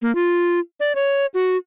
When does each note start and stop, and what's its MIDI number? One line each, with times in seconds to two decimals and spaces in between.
0.02 0.14 58
0.15 0.59 65
0.80 0.95 74
0.95 1.26 73
1.34 1.57 66